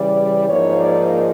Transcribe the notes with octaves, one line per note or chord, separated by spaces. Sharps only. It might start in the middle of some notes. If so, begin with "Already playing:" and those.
Already playing: C#3 E3 G3 D5
G#2 F3 A#3 D#4 C#5
D5